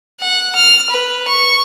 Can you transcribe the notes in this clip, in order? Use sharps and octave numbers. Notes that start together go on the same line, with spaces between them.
F#5
F6
B4
C#6